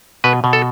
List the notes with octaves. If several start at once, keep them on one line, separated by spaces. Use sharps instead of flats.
B2 B4
B2
A4